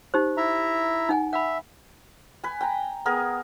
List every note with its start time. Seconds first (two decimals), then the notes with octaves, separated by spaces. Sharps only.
0.14 D#4 G4 C5
0.37 E4 E5 A#5
1.09 D#4 F#5 G#5
1.33 E5 F#5 B5
2.44 B4 G#5
2.61 G5 A#5
3.06 B3 G#4 A#4